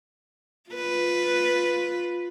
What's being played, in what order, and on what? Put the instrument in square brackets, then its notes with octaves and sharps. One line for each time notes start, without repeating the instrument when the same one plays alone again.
[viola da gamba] F4 B4